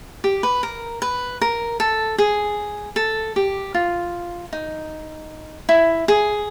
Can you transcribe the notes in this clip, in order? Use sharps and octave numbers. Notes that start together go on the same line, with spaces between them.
G4
B4
A#4
B4
A#4
A4
G#4
A4
G4
F4
D#4
E4
G#4